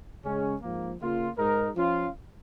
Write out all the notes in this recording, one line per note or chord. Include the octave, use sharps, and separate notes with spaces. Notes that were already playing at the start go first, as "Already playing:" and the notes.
C#3 G#3 C#4
G#2 F3 A#3
C#3 A#3 F4
G#2 G#3 D#4 A#4
F3 C#4 F4